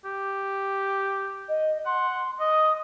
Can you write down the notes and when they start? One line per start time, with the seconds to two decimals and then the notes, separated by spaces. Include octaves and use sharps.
0.05 G4
1.48 D#5
1.85 F#5 C6
2.40 D#5 D#6